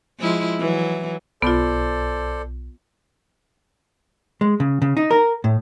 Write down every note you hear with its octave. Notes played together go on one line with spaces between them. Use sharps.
F3 G#3 E4
E3 F#3
B1 B3 F4 A4 C5 D5
G#3
C#3
C#3
D#4
A#4
A2